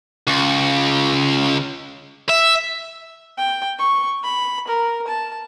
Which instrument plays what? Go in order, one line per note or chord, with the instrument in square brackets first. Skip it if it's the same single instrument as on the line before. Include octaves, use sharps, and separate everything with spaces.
[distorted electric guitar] C#2
E5
[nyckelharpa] G5
C#6
B5
A#4
A5